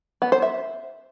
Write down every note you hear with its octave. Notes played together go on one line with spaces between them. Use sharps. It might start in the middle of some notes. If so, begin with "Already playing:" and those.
B3
C5
E5